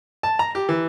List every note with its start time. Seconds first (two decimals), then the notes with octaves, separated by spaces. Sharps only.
0.23 A5
0.39 A#5
0.55 G4
0.69 E3